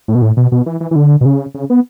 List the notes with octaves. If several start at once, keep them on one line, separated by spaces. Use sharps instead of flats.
A2
B2
A2
B2
B2
E3
E3
E3
D3
B2
C#3
C#3
B3